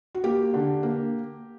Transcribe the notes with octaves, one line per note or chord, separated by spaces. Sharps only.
F#4
A#3 G4
D3
A#3